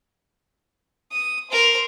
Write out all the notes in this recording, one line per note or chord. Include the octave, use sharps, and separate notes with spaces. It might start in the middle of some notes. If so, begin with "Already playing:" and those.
D#6
A#4 C5